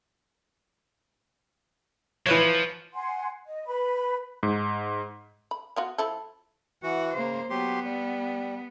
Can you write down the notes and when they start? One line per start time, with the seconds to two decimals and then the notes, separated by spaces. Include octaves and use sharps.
2.26 E3 F3 B4 C#5
2.94 F#5 G#5 C6
3.47 D#5
3.67 B4 B5
4.43 G#2
5.51 B5
5.76 B3 F4 F#4
5.98 F3 E4 A4
6.83 E3 F#4 F#5
7.14 C#3 A#3 C5
7.50 F#3 B3 G4 C6
7.84 G3